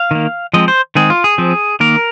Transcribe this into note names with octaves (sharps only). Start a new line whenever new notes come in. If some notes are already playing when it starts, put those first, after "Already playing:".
Already playing: F5
D#3 A#3
F3 G#3 C4 D#5
C5
D#3 G#3 C4 G#4
F4
G#4
F3 C4
D#3 A#3 A#4